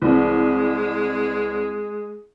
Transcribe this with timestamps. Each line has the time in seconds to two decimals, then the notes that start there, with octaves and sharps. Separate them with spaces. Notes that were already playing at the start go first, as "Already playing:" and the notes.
0.01 C2 E3 G#3